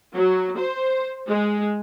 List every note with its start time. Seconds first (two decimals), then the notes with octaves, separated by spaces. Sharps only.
0.15 F#3
0.59 C5
1.28 G#3